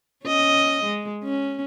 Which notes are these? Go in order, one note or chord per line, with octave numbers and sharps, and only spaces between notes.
C#4 D#5
G#3
C#4